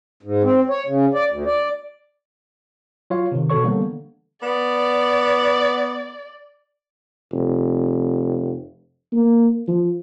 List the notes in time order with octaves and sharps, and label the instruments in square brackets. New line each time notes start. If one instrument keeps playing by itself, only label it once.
[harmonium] G#2
C4
C#5
C#3
D5
D2
D5
[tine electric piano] F#3 F4 C#5 F5
C3 D#3
B2 D3 A4 C#5 C#6
D3 E3 G3 A#3 B3
[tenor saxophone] B3 [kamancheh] D5
[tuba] F1
A#3
F3